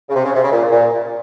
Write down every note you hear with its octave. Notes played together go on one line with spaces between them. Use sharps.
C#3
C3
C#3
C3
C#3
A#2
A#2